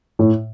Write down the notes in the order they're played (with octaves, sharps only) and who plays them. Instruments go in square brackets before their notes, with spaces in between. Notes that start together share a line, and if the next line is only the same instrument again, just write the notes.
[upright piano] A2